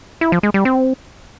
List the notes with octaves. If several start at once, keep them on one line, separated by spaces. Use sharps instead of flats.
E4
F3
G#3
G3
C4